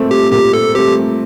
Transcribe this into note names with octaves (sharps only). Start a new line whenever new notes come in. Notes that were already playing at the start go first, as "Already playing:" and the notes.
Already playing: A#2 A3 C4
G4
A#2 G4
A4
A3 C4 G4